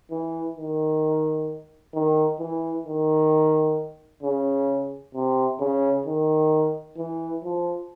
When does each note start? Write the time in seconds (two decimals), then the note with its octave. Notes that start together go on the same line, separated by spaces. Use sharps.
0.11 E3
0.56 D#3
1.94 D#3
2.39 E3
2.85 D#3
4.23 C#3
5.14 C3
5.60 C#3
6.06 D#3
6.97 E3
7.43 F3